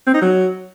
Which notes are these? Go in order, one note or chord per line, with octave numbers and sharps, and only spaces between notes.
C4
D#4
F#3